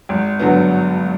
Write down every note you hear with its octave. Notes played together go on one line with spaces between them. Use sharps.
G#1
G2 D3 F#3 B3